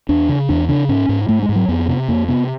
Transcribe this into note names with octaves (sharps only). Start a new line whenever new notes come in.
E2 D4
C#3
E2 D4
C#3 D4
G#2 C#4
G#2
G#2 A3
G#3
G#2
F#3
F2 B3
C3
F2 A#3
C3 B3